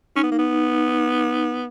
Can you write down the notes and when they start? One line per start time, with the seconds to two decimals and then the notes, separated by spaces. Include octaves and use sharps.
0.16 C#4 D#4
0.23 B3
0.31 A#3
0.39 B3